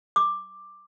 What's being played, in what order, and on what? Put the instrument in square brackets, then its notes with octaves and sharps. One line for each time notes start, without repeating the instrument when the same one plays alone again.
[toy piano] D6